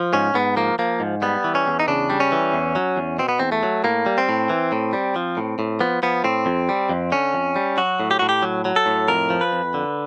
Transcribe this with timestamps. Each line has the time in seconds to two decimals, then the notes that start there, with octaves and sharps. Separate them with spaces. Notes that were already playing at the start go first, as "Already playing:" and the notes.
Already playing: F3
0.13 G#2 C#4
0.34 G#2 B3
0.56 F3 A#3
0.79 F3 A#3
1.00 G#2
1.22 G3 B3
1.44 E3
1.55 C#4
1.67 E2
1.80 D#4
1.88 C#3 D4
2.10 G3
2.20 C#4
2.32 E3
2.53 E2
2.75 F#3
2.96 E2
3.19 B2 C4
3.29 B3
3.39 E2 C4
3.52 A3
3.63 F#3
3.84 A2 A#3
4.06 G3
4.18 C4
4.29 A2
4.49 E3
4.72 A2
4.93 G3
5.16 F3
5.37 A2
5.59 A2
5.80 F3 B3
6.03 F3 B3
6.24 A2 C4
6.46 F2
6.69 G3
6.89 F2
7.12 D3 C#4
7.34 F2
7.56 G3
7.77 F#3 F#4
8.00 A2
8.11 G4
8.19 A2 F#4
8.29 G4
8.42 F#3
8.65 F#3
8.76 A4
8.86 A2
9.08 F2 A#4
9.30 F3
9.41 B4
9.52 F2
9.74 D3